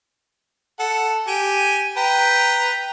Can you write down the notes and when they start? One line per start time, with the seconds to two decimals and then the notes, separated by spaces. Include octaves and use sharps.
0.80 A4 F#5
1.27 G4 G#5
1.97 B4 G5 A#5